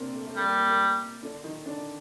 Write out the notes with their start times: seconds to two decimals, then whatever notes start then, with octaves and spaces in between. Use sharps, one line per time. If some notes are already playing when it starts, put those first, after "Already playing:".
Already playing: C3 A#3 C4 D4
0.14 A3
0.26 A3
0.36 G3 A#3
0.47 A#3
0.58 A#3
0.68 A#3
1.23 D3 D4
1.44 D#3 D#4
1.66 D3 D4